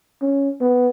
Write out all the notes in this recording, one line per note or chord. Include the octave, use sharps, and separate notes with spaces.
C#4
B3